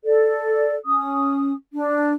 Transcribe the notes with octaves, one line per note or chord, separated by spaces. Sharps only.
A4 D5
C#4 D#6
D4